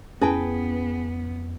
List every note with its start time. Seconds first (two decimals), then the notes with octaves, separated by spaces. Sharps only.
0.21 F2 B3 C#4 E4 G#4 B4 G5 A5